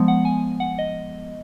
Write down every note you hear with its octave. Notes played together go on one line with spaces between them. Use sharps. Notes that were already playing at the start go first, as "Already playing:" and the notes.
Already playing: F3 G#3 B3
F#5
G#5
F#5
D#5